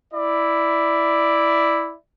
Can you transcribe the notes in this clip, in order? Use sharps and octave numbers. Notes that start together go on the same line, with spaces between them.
E4 D5